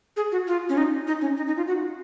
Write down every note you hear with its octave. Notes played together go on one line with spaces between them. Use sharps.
G#4
F#4
F4
C#4
D#4
D#4
C#4
D#4
D#4
F4
F#4